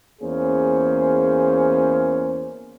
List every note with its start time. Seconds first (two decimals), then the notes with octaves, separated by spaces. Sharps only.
0.22 E2 A#3 C#4 G#4 C5